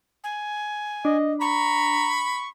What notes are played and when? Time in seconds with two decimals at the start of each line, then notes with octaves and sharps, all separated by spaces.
0.24 G#5
1.05 D4 D#5
1.41 A#5 B5 C#6